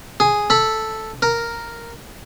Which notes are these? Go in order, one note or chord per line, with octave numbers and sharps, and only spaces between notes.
G#4
A4 B5
A#4